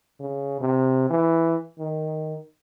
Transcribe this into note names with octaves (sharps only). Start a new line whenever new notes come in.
C#3
C3
E3
D#3